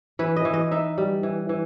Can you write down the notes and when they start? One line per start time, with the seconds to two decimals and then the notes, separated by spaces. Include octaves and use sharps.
0.19 E3 B4
0.36 D#5
0.45 E3
0.54 D#5
0.71 D#4 E5
0.98 G3
1.23 E3
1.49 E3